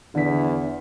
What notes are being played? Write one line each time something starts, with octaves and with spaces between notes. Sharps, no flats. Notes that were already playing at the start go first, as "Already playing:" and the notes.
E2 D3 B6